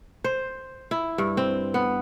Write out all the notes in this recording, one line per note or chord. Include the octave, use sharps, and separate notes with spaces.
C5
E4
G2
C4
B3